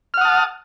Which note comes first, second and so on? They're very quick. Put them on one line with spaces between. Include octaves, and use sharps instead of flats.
F6 F#5 D#6 A5